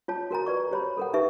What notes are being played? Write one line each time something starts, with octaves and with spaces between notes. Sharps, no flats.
F4 C#5 A5
F#4 A#4 G#5 A#5
B4 D5 C#6
G4 C5 C#5 A#5 B5
A4 A#4 F#5
D#4 G4 B4 E5 C#6